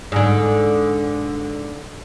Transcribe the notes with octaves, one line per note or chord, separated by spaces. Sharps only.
G#2 D3